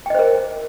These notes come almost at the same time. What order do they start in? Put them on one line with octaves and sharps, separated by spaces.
G5 D#5 C5 A#4